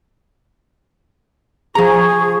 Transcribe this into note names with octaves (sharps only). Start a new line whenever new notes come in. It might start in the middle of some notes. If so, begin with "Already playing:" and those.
F3 G#4 A#5 C#6